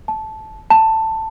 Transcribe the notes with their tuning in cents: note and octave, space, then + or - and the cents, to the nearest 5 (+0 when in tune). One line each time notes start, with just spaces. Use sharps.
A5 -15
A5 +10